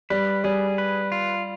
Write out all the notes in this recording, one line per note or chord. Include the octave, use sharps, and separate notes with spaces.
G3 B4
G3 G#4
B4
F4